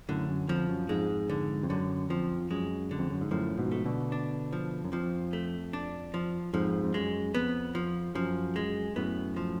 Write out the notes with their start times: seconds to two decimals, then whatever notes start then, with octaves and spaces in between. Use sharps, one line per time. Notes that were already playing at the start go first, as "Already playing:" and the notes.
0.09 F#2 A2 D3
0.29 F#2
0.48 F2 F3
0.69 F#2
0.89 F2 G#2 G#3
1.30 D3
1.63 F2
1.70 F#2 D3
2.10 F2 F3
2.51 F#2 G#3
2.91 D3
2.99 F2
3.10 F#2
3.21 G#2
3.31 F#2 A2 F3
3.58 G#2 B2
3.72 A3
3.85 B2 D3
4.12 D4
4.53 F3
4.84 F#2
4.92 F2 F3
5.33 A3
5.73 D4
6.14 F3
6.53 F2 G#2 F3
6.84 F2
6.94 F#2 G#3
7.34 F2 B3
7.75 F3
8.15 F#2 F3
8.56 G#3
8.96 F#2 A2 B3
9.36 F3